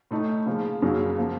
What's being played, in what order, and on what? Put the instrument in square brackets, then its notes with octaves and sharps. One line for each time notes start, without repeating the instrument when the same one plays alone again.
[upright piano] A2 A3 D#4
C#3 F3 A#3
F#2 C#3 F#3 A#3
F3 A#3